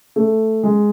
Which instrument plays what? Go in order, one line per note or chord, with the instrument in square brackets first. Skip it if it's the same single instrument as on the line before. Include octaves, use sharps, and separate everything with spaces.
[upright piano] A3
G#3